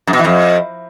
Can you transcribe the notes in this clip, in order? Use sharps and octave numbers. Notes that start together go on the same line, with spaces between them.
F#2
B2
E3
F2